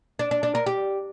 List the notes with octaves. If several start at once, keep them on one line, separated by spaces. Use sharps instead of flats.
D4
D4
D4
A#4
G4